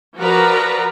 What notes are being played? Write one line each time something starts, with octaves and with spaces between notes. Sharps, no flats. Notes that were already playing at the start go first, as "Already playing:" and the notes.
F3 F#4 A#4 B4 D5 A#5